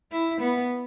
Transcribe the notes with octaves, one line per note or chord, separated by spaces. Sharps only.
E4
B3